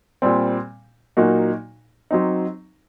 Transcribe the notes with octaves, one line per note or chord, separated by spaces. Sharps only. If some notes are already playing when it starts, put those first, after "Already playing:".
A#2 G3 C4
A#2 F#3 A#3 D#4 F#4
F#3 C4 D#4